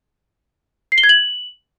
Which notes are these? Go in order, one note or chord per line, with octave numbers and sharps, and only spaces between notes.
C7
G7
G#6
F#7